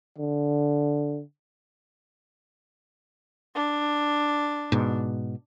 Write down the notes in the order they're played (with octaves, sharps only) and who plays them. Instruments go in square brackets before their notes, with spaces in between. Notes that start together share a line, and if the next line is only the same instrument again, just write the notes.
[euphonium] D3
[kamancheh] D4
[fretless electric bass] G#2 B2